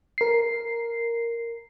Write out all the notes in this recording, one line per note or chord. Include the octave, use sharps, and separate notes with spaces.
A#4 C7